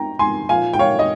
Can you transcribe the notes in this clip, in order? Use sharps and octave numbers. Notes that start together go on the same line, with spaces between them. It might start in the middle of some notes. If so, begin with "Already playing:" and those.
Already playing: G5 A#5
G#5 C6
A#2 F3 F5 G#5
G5
C#5 F5
D#5